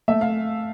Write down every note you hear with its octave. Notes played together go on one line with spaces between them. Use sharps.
A3 E5
F5